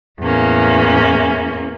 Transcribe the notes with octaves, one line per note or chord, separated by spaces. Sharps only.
E2 A2 A#3 C#4